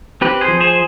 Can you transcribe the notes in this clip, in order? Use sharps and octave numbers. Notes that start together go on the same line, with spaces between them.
C4 G4 B4
G#4 C5
F3
G#4 C5